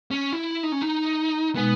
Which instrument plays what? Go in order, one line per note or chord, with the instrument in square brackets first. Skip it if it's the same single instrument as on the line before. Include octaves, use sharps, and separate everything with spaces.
[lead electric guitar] C#4
E4
D#4
C#4
D#4
[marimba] B2 G#3 D#4 [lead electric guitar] B3